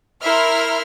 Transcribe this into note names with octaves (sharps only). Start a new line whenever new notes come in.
E4 A#4 E5 C6 F6